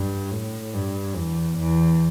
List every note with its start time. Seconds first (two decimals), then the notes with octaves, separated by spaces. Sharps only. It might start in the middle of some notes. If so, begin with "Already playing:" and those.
Already playing: G2
0.32 A2
0.74 G2
1.16 E2
1.58 E2